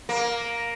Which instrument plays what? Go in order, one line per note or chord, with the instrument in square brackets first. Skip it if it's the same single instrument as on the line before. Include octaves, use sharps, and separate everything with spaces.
[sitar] A#3